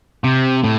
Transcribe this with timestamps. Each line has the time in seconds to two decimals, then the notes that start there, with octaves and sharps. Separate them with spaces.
0.24 C3
0.64 A2